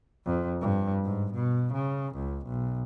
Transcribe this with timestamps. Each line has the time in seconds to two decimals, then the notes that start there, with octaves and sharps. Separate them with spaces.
0.26 F2
0.61 G2
1.05 G#2
1.33 B2
1.73 C#3
2.15 C#2
2.46 B1